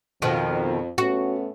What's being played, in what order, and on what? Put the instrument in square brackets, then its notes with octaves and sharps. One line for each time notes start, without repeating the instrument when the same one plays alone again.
[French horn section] F2 [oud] B2 D#3 F3
[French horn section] A3 B3 C#4 [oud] F#4